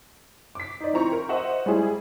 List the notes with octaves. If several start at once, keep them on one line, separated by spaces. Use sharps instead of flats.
D6 B6
D#4 D5
F3 C4 E4 A#5 C#6
A#4
C5 D#5 E5 F#5 C#6
G3 G#3 E4 G#4